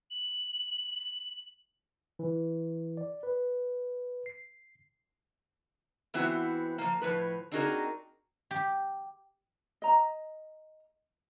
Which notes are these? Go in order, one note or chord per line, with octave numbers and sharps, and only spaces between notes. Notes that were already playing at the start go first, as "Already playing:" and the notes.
F#7
E3
D5
B4
C7
E3 B3 C4 E4 F#4
F3 A#3
A2 F3 B4
C4 D4 D#4 F#4 G#4 A#4
G4
D#5 A#5